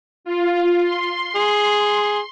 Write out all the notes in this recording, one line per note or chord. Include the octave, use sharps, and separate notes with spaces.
F4
C6
G#4